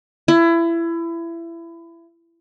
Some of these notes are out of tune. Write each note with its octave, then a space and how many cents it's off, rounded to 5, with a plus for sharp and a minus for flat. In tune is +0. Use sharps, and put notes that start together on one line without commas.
E4 +25